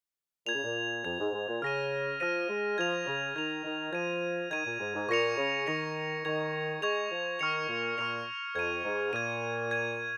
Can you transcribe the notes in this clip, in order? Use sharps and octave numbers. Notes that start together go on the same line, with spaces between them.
A#2 G#6 F7
C#3
A#2
F2 G#6 F7
G#2
G#2
A#2
C#3 F6 A#6 D#7
F3 F6 A#6 D#7
G#3
F3 G#6 F7
C#3
D#3 G#6 F7
D#3
F3 G#6 D#7
D#3 G#6 D#7
A#2
G#2
G#2
A#2 C#6 A#6 C#7 F7
C#3
D#3 C#6 A#6 C#7 F7
D#3 C#6 G#6 F7
G#3 C#6 G#6 F7
F3
D#3 C#6 F6 C#7 F7
A#2
A#2 C#6 F6 C#7 F7
F2 G#6 D#7
G#2
A#2 G#6 D#7
G#6 D#7